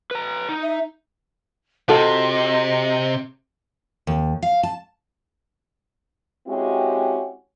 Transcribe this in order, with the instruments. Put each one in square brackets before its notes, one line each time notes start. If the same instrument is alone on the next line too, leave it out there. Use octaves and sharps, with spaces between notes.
[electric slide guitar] B4 A#5
D#4
[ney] E5
[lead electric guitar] C3 [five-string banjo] F4 F#4 A4 [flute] D#5
[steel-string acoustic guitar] D#2
F5
A5
[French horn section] G#3 C4 C#4 E4 F#4 G4